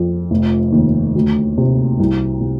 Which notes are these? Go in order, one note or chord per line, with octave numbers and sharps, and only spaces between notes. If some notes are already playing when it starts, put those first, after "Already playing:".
Already playing: F2
F1
D#2
D2
C3
C2
C3